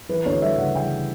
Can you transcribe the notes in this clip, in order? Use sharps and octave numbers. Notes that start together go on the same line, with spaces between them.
E3 B4
D2 C#5
G3 E5
C#3 F#5
E3 G5